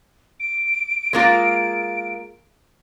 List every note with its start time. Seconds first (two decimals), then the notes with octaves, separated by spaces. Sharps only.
0.40 D7
1.13 G#3 A#3 F4